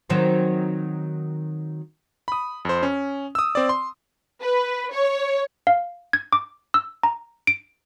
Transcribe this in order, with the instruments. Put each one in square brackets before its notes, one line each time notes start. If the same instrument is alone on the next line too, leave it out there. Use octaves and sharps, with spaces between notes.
[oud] D#3 F#3 C4
[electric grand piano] B5 D#6
F2 C5
C#4
D#6 E6
C4 D5
C6
[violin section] B4
C#5
[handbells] F5
G#6
D6
E6
A#5
D7